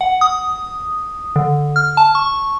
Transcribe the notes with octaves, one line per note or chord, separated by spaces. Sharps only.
F#5
D#6
D3
F6
A5
C#6